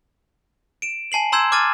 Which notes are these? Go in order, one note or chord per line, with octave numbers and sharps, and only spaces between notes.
D7 E7
G#5 A5 C7 F#7
A#5 C6 E6 G6 G#6 E7
D6 F6 G#6 A6 D#7